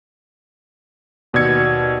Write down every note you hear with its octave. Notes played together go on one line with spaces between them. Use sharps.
D#2 B2 D5 E6 G#6 C#7